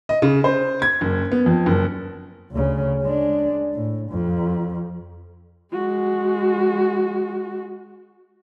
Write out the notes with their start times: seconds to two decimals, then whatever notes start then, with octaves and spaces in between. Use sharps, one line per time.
0.09 D#5
0.22 C#3
0.44 C5
0.82 G#6
1.01 F#1
1.32 B3
1.46 F2
1.66 F#1
2.51 D2 C#3
3.02 G#3 D4
3.74 A2
4.11 F2
5.72 G#3 F#4